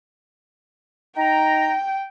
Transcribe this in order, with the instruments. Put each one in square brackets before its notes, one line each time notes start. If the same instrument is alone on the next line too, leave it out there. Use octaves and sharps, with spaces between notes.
[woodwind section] D#4 A#5 [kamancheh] G5